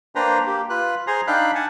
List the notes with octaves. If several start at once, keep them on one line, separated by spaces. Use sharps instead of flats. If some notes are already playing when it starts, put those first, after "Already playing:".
A#3 D4 B4 C5 G5 A#5
A#3 G4
F4 B4 F#6
G#4 C5 G#5 A#5 C6
D4 D#4 F5 G5 B5 F#6
F#5 G#5 A5